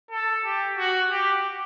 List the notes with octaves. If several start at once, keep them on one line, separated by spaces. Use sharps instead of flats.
A4
G4
F#4
G4